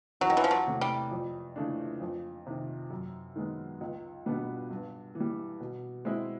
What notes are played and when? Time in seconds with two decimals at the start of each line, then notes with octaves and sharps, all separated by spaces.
0.21 E2 F#3
0.30 D#3
0.37 E3
0.44 F3
0.51 F#3
0.67 C3 E3 A3 C#4
0.81 G3
1.11 F2
1.56 C#3 E3 A3 D4
2.01 F2
2.47 C3 D#3
2.90 F#2
3.36 D#3 G#3 B3
3.81 C#2
4.26 B2 G3 B3 D4
4.71 G2
5.15 E3
5.20 G3
5.60 B2
6.05 G#3 C4 E4